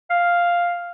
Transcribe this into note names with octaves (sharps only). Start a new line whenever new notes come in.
F5